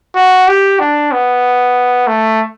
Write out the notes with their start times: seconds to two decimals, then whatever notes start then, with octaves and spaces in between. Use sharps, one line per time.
0.15 F#4
0.48 G4
0.80 D4
1.12 B3
2.07 A3